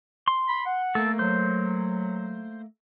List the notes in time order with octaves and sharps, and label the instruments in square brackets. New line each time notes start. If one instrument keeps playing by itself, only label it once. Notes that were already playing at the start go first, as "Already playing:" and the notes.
[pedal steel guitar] C6
[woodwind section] B5
F#5
[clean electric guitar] A3 A#3 [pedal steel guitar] A4
[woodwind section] F#3 [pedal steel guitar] C5